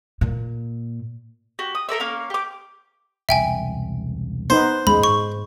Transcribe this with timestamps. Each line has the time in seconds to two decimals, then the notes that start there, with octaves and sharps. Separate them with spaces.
0.21 A#2
1.59 F#4 G4
1.75 D#6
1.89 A4 A#4 D5 E5
2.00 A#3 C#4 F5
2.30 G4 D6
3.29 E1 C2 E5 G5 G#5
4.50 B3 D#4 B4 C5
4.87 D#2 G#3 B3 C#4 B5
5.03 G#2 C#6